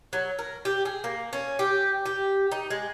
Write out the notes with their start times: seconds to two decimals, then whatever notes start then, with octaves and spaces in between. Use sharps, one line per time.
0.13 F#3
0.39 A#4
0.65 G4
0.85 G#4
1.04 A#3
1.33 C#4
1.59 G4
2.06 G4
2.52 D#4
2.70 G#3